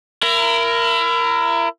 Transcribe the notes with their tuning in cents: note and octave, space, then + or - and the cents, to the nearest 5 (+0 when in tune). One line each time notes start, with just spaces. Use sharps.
E4 +30 A#4 +0